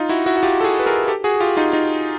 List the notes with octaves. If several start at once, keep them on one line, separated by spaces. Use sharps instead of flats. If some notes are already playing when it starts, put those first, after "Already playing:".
Already playing: D#4 F4
E4 F#4
E4 F#4
F#4
F4 G4
A4
F#4 G#4
B4
G#4 A#4
G4 A4
F#4 G#4
F4 G4
D#4 F4
D#4 F4